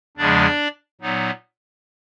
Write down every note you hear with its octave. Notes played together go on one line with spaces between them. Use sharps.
E2 C#3 F3 G#3 D4 D5
A#2 F#3 B3 D#4